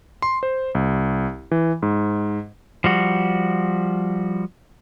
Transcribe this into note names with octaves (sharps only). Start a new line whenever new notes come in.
C6
C5
C2
E3
G#2
F3 G3 F#4